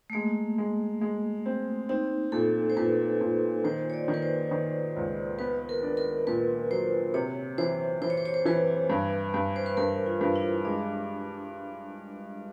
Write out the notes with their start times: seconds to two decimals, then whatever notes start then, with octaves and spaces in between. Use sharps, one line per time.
0.10 A3
0.13 G#3 A#3
0.58 G#3
1.01 G#3
1.46 C4
1.89 C4 D#4
2.32 A#2 A4
2.70 C5
2.77 A#2 B4
3.21 A#2
3.64 D#3 C5
3.90 C#5
3.94 D5
4.08 D#3
4.14 B4
4.22 C5
4.51 D#3
4.96 C#2
5.39 B3 B4
5.69 A#4
5.83 D4
5.97 A#4
6.27 A#2 B4
6.70 F#3 C5
7.14 C3 C#5
7.58 E3 C5
8.02 E3 C5
8.10 C#5
8.17 C5
8.25 C#5
8.34 C5
8.45 E3 B4
8.90 G2
9.34 G2
9.56 C5
9.66 B4
9.77 G2 A#4
10.06 F4
10.21 G2
10.36 E4
10.65 G#3 D4